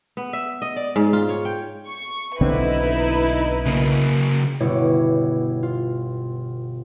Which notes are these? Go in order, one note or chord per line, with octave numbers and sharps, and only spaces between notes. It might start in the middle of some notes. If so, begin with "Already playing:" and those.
B3
E5
D#5
D5
G#2
F4
C#5
G5
C#6
B1 D3 C4 D#4 E4 B4
C#3 A#3
G1 B2 E4 C#5 D6
F4